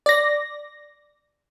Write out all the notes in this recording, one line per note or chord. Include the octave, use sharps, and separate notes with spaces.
D5 A#6